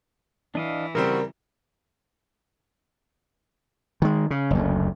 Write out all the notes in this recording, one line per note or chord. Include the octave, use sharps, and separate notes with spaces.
E3 D4 D#5 F5
C#3 G3 C4 F#4 A#4
D#3 G#3
C#3
F#1 D2